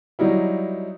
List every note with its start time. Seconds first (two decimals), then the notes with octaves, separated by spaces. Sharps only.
0.19 F#3 G3 D#4 E4